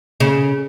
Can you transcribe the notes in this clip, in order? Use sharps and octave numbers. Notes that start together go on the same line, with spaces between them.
C#3